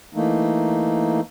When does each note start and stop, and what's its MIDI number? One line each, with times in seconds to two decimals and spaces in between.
0.15 1.21 52
0.15 1.21 57
0.15 1.21 58
0.15 1.21 63